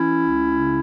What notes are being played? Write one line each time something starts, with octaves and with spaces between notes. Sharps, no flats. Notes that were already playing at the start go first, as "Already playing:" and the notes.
Already playing: E3 C#4 E4
C#2
C#3